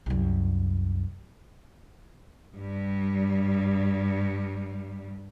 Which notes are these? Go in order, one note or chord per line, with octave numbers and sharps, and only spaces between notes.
C2 F#2
G2 G3